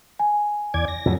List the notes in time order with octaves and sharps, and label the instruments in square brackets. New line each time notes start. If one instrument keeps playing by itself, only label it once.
[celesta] G#5
[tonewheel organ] E2 D5 G#6
A#6
[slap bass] F2 A2 F#3